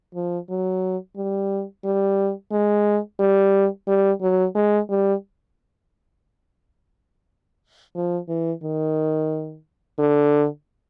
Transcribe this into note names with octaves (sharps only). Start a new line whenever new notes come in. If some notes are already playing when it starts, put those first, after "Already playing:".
F3
F#3
G3
G3
G#3
G3
G3
F#3
G#3
G3
F3
E3
D#3
D3